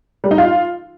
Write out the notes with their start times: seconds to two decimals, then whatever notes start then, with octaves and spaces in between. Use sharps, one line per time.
0.24 G3
0.31 D#4
0.38 F4